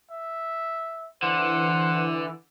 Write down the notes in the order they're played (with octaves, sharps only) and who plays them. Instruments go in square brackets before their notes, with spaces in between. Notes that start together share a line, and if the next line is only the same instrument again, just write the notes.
[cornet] E5
[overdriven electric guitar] D3 [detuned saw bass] E3 [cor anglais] C5 [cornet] F#5